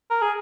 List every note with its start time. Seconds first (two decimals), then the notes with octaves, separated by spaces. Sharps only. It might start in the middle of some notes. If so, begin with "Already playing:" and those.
0.10 A#4
0.22 G#4